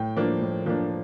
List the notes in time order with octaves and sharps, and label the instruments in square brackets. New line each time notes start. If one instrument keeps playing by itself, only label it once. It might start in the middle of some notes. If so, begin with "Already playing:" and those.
Already playing: [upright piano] A2 G5
F3 A#3 D4
A2
F3 A#3 D4